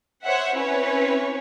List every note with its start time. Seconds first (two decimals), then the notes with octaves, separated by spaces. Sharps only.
0.24 C5 C#5 E5 F#5
0.56 C4 C#4 E4 B4 C#5